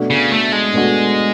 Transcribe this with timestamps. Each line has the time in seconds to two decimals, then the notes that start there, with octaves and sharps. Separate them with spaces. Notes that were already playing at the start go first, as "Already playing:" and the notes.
Already playing: B2 A3 D4 F#4
0.10 C#3
0.32 A3
0.52 G#3
0.73 B2 A3 D4 F#4